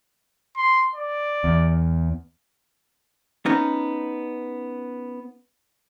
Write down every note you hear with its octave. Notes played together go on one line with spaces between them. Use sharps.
C6
D5
E2
B3 C#4 D#4